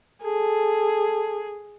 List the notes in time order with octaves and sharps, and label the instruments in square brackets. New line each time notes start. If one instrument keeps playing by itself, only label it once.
[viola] G#4 [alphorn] A4